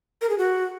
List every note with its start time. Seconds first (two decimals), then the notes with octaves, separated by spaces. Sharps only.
0.21 A#4
0.29 G#4
0.38 F#4